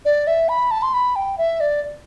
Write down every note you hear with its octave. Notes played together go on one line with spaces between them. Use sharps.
D5
E5
B5
A5
C6
B5
G5
E5
D5